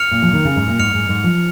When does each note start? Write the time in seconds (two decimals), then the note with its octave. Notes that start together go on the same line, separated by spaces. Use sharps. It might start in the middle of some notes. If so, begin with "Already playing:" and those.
Already playing: F6 C#7 F7
0.11 A#2
0.22 F3
0.33 D#3
0.45 C#3
0.56 G#2
0.68 A#2
0.79 G#2 F6 C#7 F7
0.94 G#2
1.09 G#2
1.24 F3